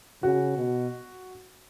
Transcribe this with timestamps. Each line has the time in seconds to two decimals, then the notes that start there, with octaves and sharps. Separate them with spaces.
0.22 C#3 F#4
0.57 B2